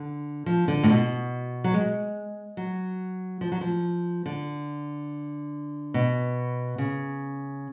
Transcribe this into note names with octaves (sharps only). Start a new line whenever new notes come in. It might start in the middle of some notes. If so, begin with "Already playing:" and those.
Already playing: D3
F3
D3
A2
B2
F#3
G#3
F#3
F3
F#3
F3
D3
B2
C#3